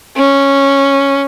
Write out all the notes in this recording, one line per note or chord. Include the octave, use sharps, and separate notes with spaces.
C#4